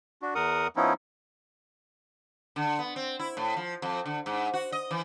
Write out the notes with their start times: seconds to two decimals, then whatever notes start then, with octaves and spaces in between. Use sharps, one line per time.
0.22 D4 F#4
0.35 E2 A#4 F#5 D#6
0.76 F3 B3 C#4 D#4 E4
2.56 D3
2.79 B3
2.96 C4
3.19 E4
3.37 A2
3.57 F3
3.82 F2
4.06 D3
4.26 G#2
4.54 F#4
4.72 D#5
4.91 E3